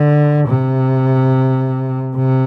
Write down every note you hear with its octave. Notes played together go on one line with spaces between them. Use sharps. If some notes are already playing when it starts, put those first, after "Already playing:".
Already playing: D3
C3
C3